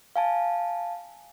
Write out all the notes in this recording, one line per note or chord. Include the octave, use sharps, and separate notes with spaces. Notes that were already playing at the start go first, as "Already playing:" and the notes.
F5 G#5 A5